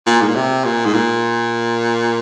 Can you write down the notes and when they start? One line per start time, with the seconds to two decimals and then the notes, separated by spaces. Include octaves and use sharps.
0.06 A#2
0.21 G#2
0.28 A#2
0.35 C3
0.65 A#2
0.85 G#2
0.94 A#2